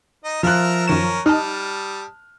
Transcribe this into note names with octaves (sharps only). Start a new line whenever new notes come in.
D#4 D#5
F3 F4 A#4 E5 F6 F#6
F#2 D#3 C#4 A#4 E7
G3 D#4 D#5 A5 D#6 F6